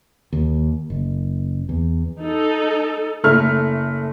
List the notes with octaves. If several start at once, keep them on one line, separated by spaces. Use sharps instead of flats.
D#2
F#1
E2
D#4 A4
F#1 A3 F6